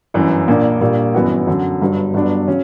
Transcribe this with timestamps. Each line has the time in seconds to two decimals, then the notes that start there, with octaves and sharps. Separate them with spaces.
0.14 G1 F#2 E3
0.48 A#1 A#2 A#3 D4
0.81 A#1 A#2 G3 A#3
1.14 G1 F#2 E3 B3 F#4
1.47 F#2 D3 F#3
1.81 G1 G2 F#3
2.14 G1 G2 F#3 B3 D4
2.48 C#3 F#3 C#4